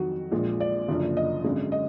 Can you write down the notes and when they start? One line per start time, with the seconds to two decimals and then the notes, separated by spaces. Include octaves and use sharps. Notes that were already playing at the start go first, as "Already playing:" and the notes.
Already playing: F2 D#3 F#3 F#4
0.31 A#1 A#2 F3 G#3
0.60 D5
0.88 F#1 F#2 D3 F3
1.17 D#5
1.44 G#1 F#2 D3 G#3
1.72 D#5